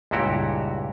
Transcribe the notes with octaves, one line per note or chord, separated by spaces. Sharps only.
C#2 G2 A#2 E4 F#4 G4